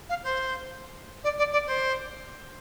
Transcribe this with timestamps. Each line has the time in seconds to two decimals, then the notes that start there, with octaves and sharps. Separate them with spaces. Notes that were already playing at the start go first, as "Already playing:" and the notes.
0.09 F5
0.23 C5
1.23 D5
1.37 D5
1.52 D5
1.66 C5